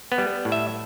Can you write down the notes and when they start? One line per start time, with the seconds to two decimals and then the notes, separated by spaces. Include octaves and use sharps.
0.12 B3
0.18 G3
0.45 A2
0.52 E5